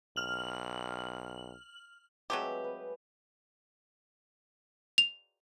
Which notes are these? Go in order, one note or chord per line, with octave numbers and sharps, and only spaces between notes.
B1 F6 F#7
F#3 G#3 A3 C4 G4 B4
B4
F7